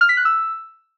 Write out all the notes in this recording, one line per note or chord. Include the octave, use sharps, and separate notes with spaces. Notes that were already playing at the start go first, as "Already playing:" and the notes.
F6
B6
F#6
E6